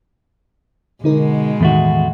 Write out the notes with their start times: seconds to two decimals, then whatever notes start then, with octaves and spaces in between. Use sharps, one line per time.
1.04 B2 D3 G#3 D#4 A#4
1.61 E2 A2 D#3 A3 F#4